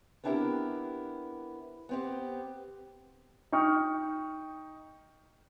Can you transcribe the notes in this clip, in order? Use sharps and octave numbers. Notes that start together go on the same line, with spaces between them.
B3 C4 D4 E4 G4 A#4
B3 C4 G4
D#4 G5 C#6 F6